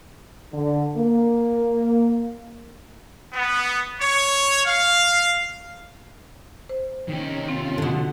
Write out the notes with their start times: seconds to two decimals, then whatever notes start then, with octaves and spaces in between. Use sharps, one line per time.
0.53 D3
0.97 A#3
3.33 B3
4.00 C#5
4.66 F5
6.69 C5
7.09 C3 D#3 C#4 D#4 G4
7.48 C3 C4 C#4 F4
7.78 B2 D3